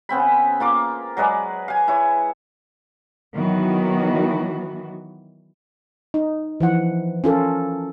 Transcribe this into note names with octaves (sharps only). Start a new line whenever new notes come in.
C#3 B3 C4 B5
A#3 F4 D6
F#3 G#3 B4 D5
F5 G#5
E4 C#5
D#3 E3 F#3 B3 F#4
D#4
E3 F3 F#5
C#4 F4 A4 A#4